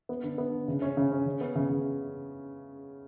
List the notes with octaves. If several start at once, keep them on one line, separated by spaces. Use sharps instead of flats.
B3
D3
B3
D3
C#3
C#4
C#3
C#4
C#3
B3
C#3
C#3